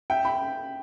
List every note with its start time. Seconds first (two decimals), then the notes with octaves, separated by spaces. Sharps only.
0.10 E5 G5
0.25 B5